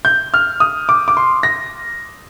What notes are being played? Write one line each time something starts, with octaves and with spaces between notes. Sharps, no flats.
G6
F6
D#6
D6
D6
C6
A#6